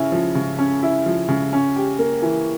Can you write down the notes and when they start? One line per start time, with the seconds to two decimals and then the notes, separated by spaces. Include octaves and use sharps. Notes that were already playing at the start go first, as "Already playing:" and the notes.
Already playing: C#3 C#4 E4
0.12 F3
0.35 C#3
0.59 C#4
0.83 E4
1.06 F3
1.29 C#3
1.53 C#4
1.76 G4
1.99 A#3
2.22 E3